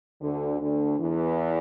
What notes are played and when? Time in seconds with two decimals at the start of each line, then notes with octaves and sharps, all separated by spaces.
0.21 D2 D3
0.61 D2 D3
1.00 E2 E3